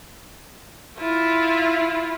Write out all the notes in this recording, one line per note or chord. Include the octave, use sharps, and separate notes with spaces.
E4 F4